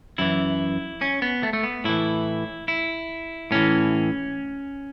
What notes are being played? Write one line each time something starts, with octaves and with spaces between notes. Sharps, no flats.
F#2 E3 E4
C#4
B3
A3
A3
B3
A2 E3 E4
E4
A2 E3 C#4